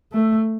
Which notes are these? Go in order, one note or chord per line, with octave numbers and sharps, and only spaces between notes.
A3